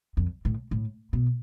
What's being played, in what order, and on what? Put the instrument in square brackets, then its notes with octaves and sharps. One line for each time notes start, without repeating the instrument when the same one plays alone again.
[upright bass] F2
A2
A2
B2